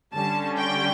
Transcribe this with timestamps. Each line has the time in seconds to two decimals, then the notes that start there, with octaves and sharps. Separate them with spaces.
0.15 D3 G3 C#4 A5
0.57 G5